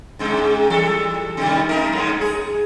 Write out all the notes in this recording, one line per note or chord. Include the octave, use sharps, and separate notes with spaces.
G#2 C3 G#3
E3 G3 A4
C3 D#3 G3
A3 D#4 A#4
G2 C#3
G#4